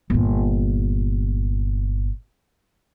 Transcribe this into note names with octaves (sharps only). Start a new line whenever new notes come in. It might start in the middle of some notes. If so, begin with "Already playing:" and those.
G1 A#2